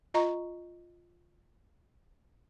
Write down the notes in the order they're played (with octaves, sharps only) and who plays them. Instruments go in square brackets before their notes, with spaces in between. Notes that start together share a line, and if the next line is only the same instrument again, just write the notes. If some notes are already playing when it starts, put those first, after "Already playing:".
[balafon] F4 D#5 A#5 C#6